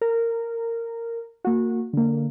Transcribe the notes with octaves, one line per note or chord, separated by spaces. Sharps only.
A#4
A#3 F#4
D3 A#3